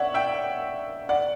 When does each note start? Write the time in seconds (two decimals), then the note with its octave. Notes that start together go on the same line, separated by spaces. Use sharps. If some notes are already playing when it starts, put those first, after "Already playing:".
Already playing: C#5 D5 E5 F#5
0.14 E5 G5
1.09 D5 F#5